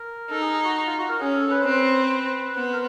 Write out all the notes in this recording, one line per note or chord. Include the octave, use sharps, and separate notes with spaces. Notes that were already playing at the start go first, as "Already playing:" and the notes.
Already playing: A#4
D#4 A4
G#4
G#4
F#4
F4
F#4
A#4
C#4 G#4
A4
B4
C5
C4 B4
B3 C5
A#4